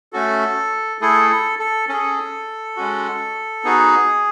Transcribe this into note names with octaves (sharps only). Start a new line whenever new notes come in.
A3 C#4 F#4 A4
A3 E4 G#4 A4
A4
A4
C#4 G#4 A4
G#3 C#4 F#4
B3 D#4 F#4 G#4